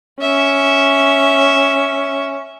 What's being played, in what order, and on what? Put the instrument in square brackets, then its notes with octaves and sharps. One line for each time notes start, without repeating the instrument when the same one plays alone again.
[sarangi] C#4 [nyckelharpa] E5